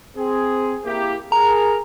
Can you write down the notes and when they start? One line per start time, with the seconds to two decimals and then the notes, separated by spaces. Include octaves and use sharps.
0.17 C4 G#4
0.85 A#3 E4 G4
1.32 G#4 A#4 A#5